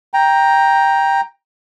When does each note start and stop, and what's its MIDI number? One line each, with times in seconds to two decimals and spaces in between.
0.14 1.21 79
0.14 1.21 82